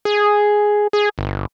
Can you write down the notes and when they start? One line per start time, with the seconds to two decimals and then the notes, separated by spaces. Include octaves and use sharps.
0.05 G#4
0.93 G#4
1.18 G1